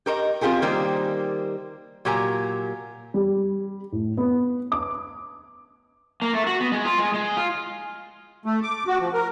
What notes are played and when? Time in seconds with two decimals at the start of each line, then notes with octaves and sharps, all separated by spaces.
0.06 G4 A#4 C5 D#5
0.41 C4 F4 G4 G#4 A#4
0.62 D#3 G3 A#3 A#4 C5
2.05 A#2 F#3 G4 A#4 G#5 A#5
3.14 G3
3.92 A2
4.17 B3
4.72 D6
6.22 A#3
6.33 A3
6.47 F#4
6.61 B3
6.72 G#3
6.85 F4
6.98 G#3
7.14 G#3
7.37 F4
8.46 A3
8.63 D6
8.87 F#4
9.00 F3
9.13 A#4